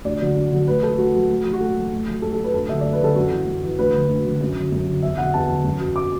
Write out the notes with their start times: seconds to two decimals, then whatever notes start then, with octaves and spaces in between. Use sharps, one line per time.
0.04 D2 D5
0.20 D3 F#3
0.36 D2
0.51 D3 F#3
0.67 A2 B4
0.82 F#3 A4
0.98 A2 F#4
1.14 F#3
1.30 A2
1.45 F#3
1.53 F#4
1.60 A2 A4
1.76 F#3
1.91 A2
2.07 F#3
2.22 A2 A4
2.33 A4
2.38 F#3
2.44 B4
2.54 D2 A4
2.69 D3 F#3 E5
2.81 D2 D5
2.93 B4
3.01 D3 F#3 A4
3.15 F#2 F#4
3.31 E3
3.47 F#2
3.63 E3
3.79 D2 B4
3.94 D3 F#3
4.09 D2
4.25 D3 F#3
4.41 F#2
4.57 D3 F#3
4.72 F#2
4.87 D3 F#3
5.03 E2 E5
5.18 D3 F#3 F#5
5.34 E2 A5
5.49 D3 F#3
5.64 F#2
5.80 F#3
5.96 D6